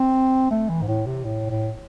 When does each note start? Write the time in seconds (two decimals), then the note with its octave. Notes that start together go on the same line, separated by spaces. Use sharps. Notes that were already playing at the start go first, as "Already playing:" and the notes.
Already playing: C4
0.51 A3
0.69 E3
0.82 G#2
0.88 A2
1.06 C3
1.24 A2
1.50 A2